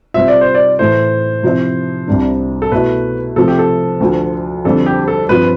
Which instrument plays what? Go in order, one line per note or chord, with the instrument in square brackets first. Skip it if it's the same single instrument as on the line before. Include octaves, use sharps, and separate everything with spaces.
[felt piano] C3 G3 C4 F4 [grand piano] E5
[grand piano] D5
C5
D5
[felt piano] A2 E3 A3 E4 [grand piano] C5
[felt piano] C3 F3 C4 E4
C2 C3 G3 D4
[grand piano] A4
[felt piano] B2 A3 E4 [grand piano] B4
[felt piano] C3 F3 A3 [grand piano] A4
[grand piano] G4
A4
[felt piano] D2 D3 F3
[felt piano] F2 D3 G3 [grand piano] A4
[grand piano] G4
A4
[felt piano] G2 F3 C4 F4 [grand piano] B4